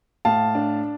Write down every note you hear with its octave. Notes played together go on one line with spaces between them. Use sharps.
A2 F5 A5
D4